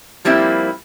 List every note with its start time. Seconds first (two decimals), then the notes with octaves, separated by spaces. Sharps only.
0.25 F3 G3 A#3 C4 E4